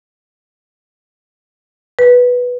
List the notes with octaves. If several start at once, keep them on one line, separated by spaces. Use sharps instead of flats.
B4